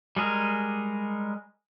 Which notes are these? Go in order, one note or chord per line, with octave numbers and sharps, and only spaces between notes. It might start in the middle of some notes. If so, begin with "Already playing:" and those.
G3 G#3 G#4 A#4